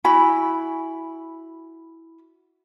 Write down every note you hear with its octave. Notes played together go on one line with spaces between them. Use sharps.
E4 F#4 G#5 B5